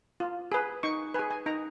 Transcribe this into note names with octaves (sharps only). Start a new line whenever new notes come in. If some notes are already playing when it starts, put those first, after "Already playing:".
F4
G#4 B4
D#4 C#6
G#4 B4 G#5
G#5
D#4 A#5